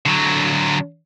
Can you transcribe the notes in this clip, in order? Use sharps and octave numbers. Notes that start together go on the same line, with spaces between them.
D3 F#3